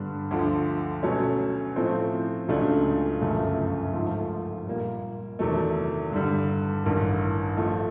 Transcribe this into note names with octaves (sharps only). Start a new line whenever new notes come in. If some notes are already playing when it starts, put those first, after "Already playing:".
Already playing: G2 D3 G3 B3 D4
D2 D3 F3
B2 F#3 A3 C#4
A2 F3 A3 C4
C#2 C#3 F#3 A3 D4
G1 F#2 C#3 F3 A3
G#2 F3 A3
A#2 G3 A#3
E2 C3 D#3 F#3 A3
G2 D3 G3
A1 G2 D#3
A2 F3 A3